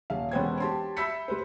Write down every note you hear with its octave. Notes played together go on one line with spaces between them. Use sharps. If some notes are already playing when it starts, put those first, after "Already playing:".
D#1 F5
E1 B3 C#4 C5 G5 G#6
G4 A5 C6
E5 B5 E6 G6 B6 C#7
G3 B4 C5